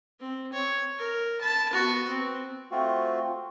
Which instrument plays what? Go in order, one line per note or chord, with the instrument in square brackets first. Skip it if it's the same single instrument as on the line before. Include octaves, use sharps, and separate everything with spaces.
[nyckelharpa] C4
C#5
A#4
A5 B5
B3 F#4
C4
[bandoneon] A3 C4 F4 F#4